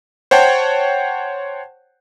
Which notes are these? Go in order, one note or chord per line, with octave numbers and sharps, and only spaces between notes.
C5 C#5 F#5 G5 A5